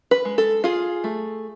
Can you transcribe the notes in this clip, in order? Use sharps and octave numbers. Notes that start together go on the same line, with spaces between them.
B4
G#3
A4
F4 G#4
A3